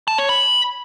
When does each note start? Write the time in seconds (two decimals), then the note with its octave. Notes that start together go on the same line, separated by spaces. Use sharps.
0.08 A5
0.18 C#5
0.29 B5